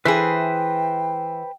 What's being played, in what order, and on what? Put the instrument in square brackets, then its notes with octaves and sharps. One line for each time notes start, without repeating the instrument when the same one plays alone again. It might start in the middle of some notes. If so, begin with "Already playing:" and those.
[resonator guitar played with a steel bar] E3 G#4 [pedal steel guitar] B4 C5 B5 [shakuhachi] G5